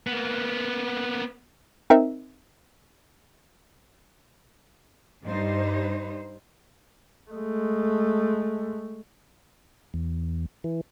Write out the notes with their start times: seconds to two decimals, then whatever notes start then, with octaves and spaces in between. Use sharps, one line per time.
0.07 A#3 B3
1.90 C4 D#4 A#4 E5
5.25 G2 G3 D#4 C5
7.31 G#3 A3
9.94 E2
10.64 E3